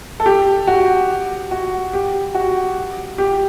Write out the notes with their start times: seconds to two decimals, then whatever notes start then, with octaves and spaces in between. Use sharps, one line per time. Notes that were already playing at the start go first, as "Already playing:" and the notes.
0.20 A4
0.26 G4
0.67 F#4
1.51 F#4
1.93 G4
2.35 F#4
3.18 G4